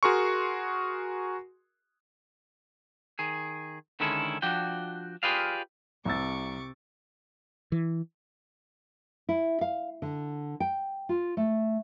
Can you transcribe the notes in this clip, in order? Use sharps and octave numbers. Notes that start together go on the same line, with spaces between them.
F#4 G#4 A#4 C6 C#6
D#3 G#4
D3 D#3 G#3 C#4 E4 A4
F3 D4 F#4 G5
F4 G4 G#4 B4 D5 F5
C2 C3 C#6 D6 E6 A6
E3
E4
F5
D3
G5
F4
A3